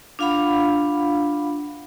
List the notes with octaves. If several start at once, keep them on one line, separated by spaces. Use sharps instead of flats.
D4 F4 F5 F#5 B5